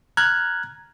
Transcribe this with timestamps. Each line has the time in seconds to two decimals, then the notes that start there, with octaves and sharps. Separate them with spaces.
0.17 A#5 F6 F#6 G#6